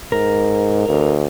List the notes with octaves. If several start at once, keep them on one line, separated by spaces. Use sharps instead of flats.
G#2 A#4
D2